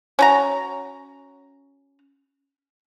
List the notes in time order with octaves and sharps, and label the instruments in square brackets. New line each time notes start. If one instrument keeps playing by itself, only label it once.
[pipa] C#4 F#4 A#5